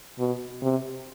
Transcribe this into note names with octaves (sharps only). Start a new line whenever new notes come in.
B2
C3